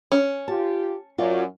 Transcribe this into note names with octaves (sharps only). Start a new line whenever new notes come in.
C#4
F4 G4 A5
F#2 F4 F#4 D5